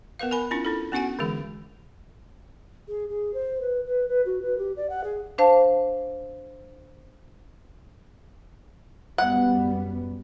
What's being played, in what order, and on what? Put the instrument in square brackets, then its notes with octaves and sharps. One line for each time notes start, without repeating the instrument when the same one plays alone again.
[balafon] B3 A#4 B4 F5
A#4 G#5 B5
C#4 D4 E4 F4
D4 E4 A4
B3 C#4 D4 F#4 F#5 G#5
D3 E3 G#3 G#4
[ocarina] G#4
G#4
C5
B4
B4
B4
F#4
B4
G4
D5
F#5
G#4
[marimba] D4 C5 F5 A5
[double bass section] F#2 G3 B3 [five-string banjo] F#5